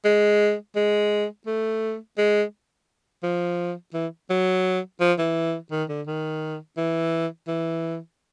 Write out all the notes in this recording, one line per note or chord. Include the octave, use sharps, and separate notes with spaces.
G#3
G#3
A3
G#3
F3
E3
F#3
F3
E3
D#3
D3
D#3
E3
E3